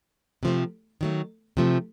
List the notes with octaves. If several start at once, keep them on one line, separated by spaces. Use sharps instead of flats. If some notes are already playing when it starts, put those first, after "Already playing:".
C3 F3 A3 C4
D#3 F#3 A3
C3 F3 A3